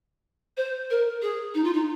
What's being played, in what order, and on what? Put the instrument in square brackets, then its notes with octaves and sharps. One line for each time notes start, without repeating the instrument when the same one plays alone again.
[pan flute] C5
A#4
G#4
D#4
F4
D#4